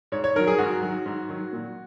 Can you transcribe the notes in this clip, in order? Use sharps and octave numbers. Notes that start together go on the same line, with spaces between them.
G#2 C#5
C#5
D#3 F#3 A#4
G#4
G#2 F#4
D#3 F#3
G#2
D#3 F#3
A#2